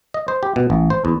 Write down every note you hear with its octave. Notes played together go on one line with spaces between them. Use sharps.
D#5
C5
G4
B2
A1
C5
E2